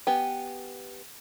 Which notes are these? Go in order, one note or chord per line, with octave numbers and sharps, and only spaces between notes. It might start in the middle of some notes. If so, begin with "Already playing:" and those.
B3 G4 G#5